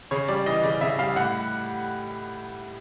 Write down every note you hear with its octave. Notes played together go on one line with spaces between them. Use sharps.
C#3 C#5
G3 D5
E3 D#5
C#3 D5
C#3 E5
G3 F5
A2 F#5